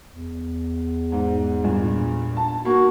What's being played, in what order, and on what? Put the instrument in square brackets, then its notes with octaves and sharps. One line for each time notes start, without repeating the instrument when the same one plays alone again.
[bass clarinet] E2
[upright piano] G#2
G2 A#2
A5
[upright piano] A#3 [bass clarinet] F#4